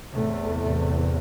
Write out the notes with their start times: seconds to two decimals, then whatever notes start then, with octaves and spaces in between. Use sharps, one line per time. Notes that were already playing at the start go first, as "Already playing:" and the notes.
0.13 E2 A2 C3 A3
0.59 A2 A3